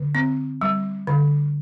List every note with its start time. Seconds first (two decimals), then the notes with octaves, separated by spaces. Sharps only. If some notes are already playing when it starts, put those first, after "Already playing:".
Already playing: D3
0.15 C4
0.61 G3
1.07 D3